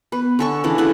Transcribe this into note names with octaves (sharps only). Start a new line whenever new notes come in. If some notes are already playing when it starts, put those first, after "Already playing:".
B3 B4
D3 A4 G#5 C#6
C#3 E3 D4
C#3 E4 A4 B4 F#5